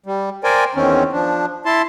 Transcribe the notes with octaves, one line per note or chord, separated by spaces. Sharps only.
G3
A#4 C5 D5 G5 G#5
E2 D#3 C4 C#4
F3 D4
E4 A5 C6